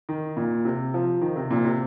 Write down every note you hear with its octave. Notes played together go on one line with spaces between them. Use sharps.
D#3
A#2
C3
F3
D#3
C3
A#2
C3